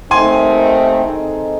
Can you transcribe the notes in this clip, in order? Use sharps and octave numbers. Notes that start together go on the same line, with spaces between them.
D#2 D#3 A3 C4 D#4 G#5 C6
D#3 G#3 C4 D#4 A4